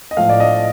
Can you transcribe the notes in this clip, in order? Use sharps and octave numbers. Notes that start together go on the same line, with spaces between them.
D#5
A2 F3 A3 F5
D5
D#5